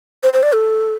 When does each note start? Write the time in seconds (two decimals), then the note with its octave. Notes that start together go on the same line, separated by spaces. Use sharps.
0.23 C5
0.33 C5
0.43 D5
0.53 A4